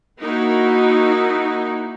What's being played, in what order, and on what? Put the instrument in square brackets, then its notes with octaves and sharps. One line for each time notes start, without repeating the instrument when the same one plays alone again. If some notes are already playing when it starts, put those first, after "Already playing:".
[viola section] A#3 D#4 E4 F#4